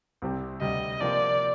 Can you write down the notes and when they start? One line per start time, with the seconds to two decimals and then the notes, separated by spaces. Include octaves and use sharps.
0.22 C2 C3 G3 C4
0.61 D2 C3 G3 D#5
1.00 C3 F3 A#3 F4 C5 D5